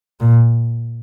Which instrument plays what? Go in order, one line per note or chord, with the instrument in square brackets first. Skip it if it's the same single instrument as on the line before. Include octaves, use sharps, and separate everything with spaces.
[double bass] A#2